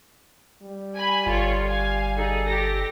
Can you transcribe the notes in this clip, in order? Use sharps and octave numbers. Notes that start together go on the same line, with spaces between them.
G3
G#5 B5
G1 F4 A4 C#5
F5 G#5
D#4 G#4 A4
G4 A4 A#6